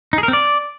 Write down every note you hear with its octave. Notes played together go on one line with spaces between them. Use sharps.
D#4
G#4
A#4
C4
D5